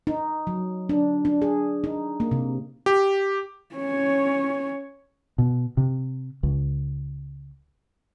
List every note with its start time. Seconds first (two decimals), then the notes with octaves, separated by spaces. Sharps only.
0.07 D#4
0.47 F#3
0.89 D4
1.25 D4
1.42 G#4
1.84 D#4
2.20 A#3
2.31 C3
2.86 G4
3.76 C#4 C#5
5.38 B2
5.77 C3
6.43 C#2